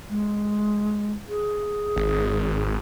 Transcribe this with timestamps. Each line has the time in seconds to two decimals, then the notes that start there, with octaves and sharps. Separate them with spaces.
0.09 G#3
1.29 G#4
1.96 G#1